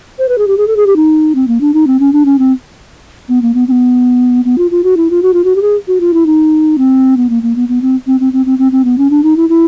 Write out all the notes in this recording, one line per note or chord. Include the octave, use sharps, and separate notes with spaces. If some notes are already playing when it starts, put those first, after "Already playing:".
C5
B4
G#4
G4
G#4
A4
G#4
G4
D#4
C4
A#3
D4
D#4
C4
C#4
D4
C#4
C4
B3
A#3
B3
C4
B3
B3
F4
F4
F#4
E4
F4
F#4
F4
F#4
G4
G#4
F#4
F4
E4
D#4
C4
B3
A#3
A#3
B3
B3
C4
C4
C4
C4
C4
C4
C4
B3
C#4
D4
D#4
E4
E4